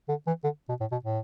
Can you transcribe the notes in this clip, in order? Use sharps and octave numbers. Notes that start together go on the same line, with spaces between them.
D3
E3
D3
B2
A2
B2
A2